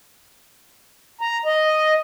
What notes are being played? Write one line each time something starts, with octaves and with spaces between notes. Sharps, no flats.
A#5
D#5